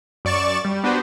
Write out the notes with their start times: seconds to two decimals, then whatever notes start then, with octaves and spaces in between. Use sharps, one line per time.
0.25 F#2 D5 C#6 A6 E7
0.65 G3
0.84 B3 D4 F#4 G4 B4 C5